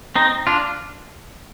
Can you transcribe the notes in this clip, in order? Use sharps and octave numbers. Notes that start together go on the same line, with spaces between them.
C4 D#4
D4 F4